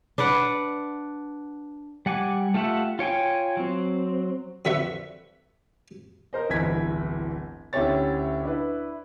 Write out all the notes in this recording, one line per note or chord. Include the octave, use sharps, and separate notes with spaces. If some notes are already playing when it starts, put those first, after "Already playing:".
D4 B4 D5 F#5
G3 F#5 G#5 D6
A3 F4 G4 E5 F#5
F4 C#5 G5 G#5
F#3 C4
F2 D3 F#4 B4 E5 C#6
A#4 C5 D#5
D1 G1 E3 G#6 B6
D2 C#4 E4 G4 C#5 A6
D4 E4 B4